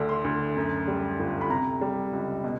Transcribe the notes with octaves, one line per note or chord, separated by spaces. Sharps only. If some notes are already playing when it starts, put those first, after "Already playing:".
Already playing: D2 D3
C6
D2
F#2
G3
G1
B5
C3 A#5
G3
C#2
B2